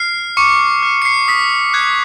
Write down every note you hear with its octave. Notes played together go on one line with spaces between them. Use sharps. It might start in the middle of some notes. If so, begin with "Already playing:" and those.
Already playing: F6 C7
C#6 D6 C#7
F6
C#7
C7
D#6 B6
F#6 G#6